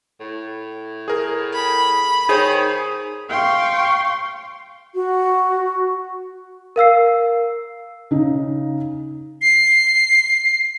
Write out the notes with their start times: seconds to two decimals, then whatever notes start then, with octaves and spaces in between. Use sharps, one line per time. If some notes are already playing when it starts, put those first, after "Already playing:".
0.21 A2
1.08 G#4 A#4
1.53 B5
2.29 D#3 G#4 C5 C#5
3.30 F5 G5 C6 C#6
4.94 F#4
6.76 A#4 F5 E6 C7
8.11 C#3 D#4
9.42 C7